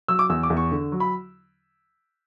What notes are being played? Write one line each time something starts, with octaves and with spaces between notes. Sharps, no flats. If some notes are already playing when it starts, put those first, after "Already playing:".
F#3 E6
D6
E2 E6
D6
E2
C#6
D3
F#3
B5